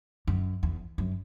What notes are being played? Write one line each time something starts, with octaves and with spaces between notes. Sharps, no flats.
F#2
E2
F#2